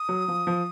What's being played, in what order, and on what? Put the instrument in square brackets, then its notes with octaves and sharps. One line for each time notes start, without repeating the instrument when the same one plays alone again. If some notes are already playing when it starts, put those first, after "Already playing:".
Already playing: [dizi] D#6
[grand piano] F#3
F3
F3